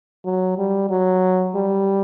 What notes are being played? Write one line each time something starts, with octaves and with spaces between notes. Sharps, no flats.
F#3
G3
F#3
G3